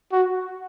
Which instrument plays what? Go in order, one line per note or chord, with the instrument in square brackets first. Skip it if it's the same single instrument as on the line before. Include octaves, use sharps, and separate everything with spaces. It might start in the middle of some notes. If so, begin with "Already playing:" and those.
[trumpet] F#4